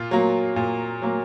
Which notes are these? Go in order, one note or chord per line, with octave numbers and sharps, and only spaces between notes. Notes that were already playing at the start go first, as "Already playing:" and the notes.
Already playing: A#2 F4
F#3 A#3
A#2
F#3 A#3